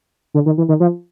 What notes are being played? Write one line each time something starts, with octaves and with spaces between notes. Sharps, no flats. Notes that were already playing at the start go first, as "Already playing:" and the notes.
D3
D#3
E3
D#3
F3